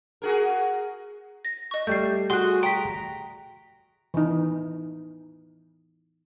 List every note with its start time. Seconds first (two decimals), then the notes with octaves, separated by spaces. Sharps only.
0.22 F#4 G#4 A#4
1.45 A#6
1.71 D#5 C#6
1.87 G3 A3 G6 C7
2.30 F#4 G#4 C6 F#6
2.63 G5 A#5 B6
4.14 E3 D#4